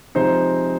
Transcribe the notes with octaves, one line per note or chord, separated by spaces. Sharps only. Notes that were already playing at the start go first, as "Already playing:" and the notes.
C3 F3 G#3 C4 D#4 C5